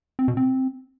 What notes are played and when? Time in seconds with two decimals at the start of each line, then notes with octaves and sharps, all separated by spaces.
0.19 C4
0.28 B2
0.37 C4